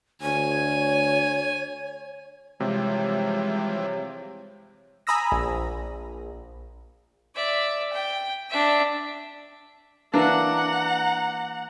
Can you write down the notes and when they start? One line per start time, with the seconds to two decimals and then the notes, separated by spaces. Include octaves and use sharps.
0.22 D2 C#5 G#5
2.60 C3 E3 F3 G3 G#3 C#5
5.07 G#5 A#5 B5 D#6 E6 A#6
5.32 A#1
7.35 D5 E5
7.93 G5
8.50 D4 E5
10.14 E3 A#3 D4 F#5 A#5